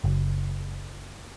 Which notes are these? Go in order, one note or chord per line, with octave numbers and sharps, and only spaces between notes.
F#1